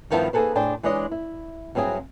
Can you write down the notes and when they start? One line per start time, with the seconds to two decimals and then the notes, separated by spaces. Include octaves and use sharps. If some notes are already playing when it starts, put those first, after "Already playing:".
0.10 G2 D#3 F3 B3 E4 A5
0.33 A#3 D#4 G#4 A4 B4 C5
0.55 A2 D4 G#4 C5 G5
0.83 E3 G#3 D4 C#5 D#5
1.12 E4
1.75 G2 F#3 C4 E4 G#4